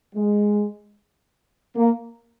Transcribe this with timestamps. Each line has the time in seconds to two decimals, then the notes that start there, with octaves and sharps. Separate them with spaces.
0.15 G#3
1.76 A#3